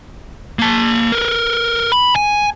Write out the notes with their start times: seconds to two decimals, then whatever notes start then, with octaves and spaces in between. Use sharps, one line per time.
0.59 A#3 A5
1.12 A#4 B4
1.92 B5
2.16 G#5